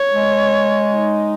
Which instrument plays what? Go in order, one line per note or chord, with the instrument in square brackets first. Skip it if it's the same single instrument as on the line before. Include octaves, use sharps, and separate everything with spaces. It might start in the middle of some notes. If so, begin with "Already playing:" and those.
Already playing: [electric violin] C#5
[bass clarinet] G#3
[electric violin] D#4